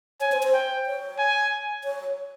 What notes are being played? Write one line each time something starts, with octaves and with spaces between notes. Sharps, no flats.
C#5 G#5
C5
C5
G5
C#5
G#5
C#5